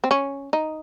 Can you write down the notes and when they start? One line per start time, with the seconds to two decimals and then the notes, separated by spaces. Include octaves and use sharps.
0.04 C4
0.11 C#4
0.53 D#4